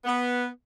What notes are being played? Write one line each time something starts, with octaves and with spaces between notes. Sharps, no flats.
B3